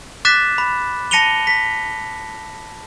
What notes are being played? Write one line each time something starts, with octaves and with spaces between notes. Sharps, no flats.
D6 F#6 A6 B6 E7
B5
A5 A#6 C#7 D#7 F7 G7
B6